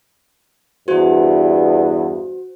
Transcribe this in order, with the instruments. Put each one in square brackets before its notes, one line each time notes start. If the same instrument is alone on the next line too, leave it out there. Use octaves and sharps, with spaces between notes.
[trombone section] E2 G2 [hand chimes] F#4 C5